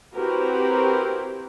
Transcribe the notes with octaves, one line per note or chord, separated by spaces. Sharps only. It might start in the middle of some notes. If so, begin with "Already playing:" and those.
C4 E4 F#4 G4 A#4 B4